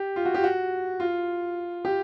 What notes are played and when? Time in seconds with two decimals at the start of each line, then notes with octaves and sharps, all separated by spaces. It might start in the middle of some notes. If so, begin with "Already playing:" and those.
Already playing: G4
0.16 F4
0.25 F#4
0.34 G4
0.44 F#4
1.00 F4
1.85 G4